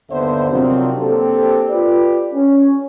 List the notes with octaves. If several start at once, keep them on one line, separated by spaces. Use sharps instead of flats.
G1 D#2 D3 B3 C5 E5
C3 D#3 F3 F#3 C4 D4
A#3 C4 D4 G4 A4
F4 G4 B4 D5
C#4